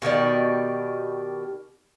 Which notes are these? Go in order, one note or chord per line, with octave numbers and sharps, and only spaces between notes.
B2 D#3 G4 D5